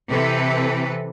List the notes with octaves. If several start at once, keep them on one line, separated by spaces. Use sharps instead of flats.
C3 E3 A4 B4